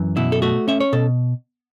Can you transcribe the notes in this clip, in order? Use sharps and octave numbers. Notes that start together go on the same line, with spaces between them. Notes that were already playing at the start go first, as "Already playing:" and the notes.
Already playing: F#2 E3
B2 E4
A4
A3 F#4
C#4 E5
C#5
B2 A4